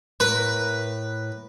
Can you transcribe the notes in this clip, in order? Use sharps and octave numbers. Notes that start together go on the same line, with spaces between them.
A2 A#4 B4